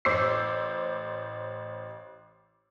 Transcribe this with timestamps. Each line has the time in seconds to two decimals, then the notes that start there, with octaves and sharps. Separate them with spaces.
0.05 A1 C5 D6 E6 C7